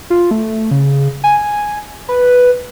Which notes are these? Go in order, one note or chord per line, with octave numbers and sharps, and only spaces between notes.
F4
A3
C#3
G#5
B4